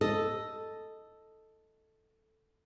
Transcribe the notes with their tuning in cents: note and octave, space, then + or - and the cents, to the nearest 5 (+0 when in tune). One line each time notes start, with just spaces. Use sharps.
A4 +0 D#5 +0